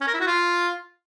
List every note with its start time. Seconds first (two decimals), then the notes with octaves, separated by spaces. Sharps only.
0.01 C#4
0.07 A#4
0.14 E4
0.20 F#4
0.27 F4